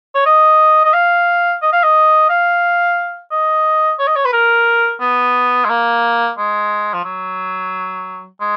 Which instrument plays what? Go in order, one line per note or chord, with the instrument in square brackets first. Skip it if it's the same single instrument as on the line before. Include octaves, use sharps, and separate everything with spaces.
[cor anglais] C#5
D#5
D#5
F5
D#5
F5
D#5
F5
D#5
C#5
D#5
C#5
B4
A#4
B3
G#3
A#3
G#3
F3
F#3
G#3